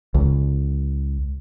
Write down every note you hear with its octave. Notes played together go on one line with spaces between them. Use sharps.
C#2